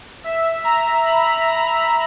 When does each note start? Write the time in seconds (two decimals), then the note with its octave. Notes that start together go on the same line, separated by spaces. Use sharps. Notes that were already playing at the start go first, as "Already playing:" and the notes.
0.24 E5
0.64 A#5
1.05 B5
1.45 A#5